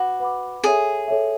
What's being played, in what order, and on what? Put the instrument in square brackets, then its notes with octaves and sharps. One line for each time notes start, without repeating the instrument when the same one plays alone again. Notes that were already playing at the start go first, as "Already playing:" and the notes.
Already playing: [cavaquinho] F#4 [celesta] B4 F#5 B5 D6
[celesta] B4 F#5 B5 D6
[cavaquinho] G#4 [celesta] A4 C#5 E5
[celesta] A4 C#5 E5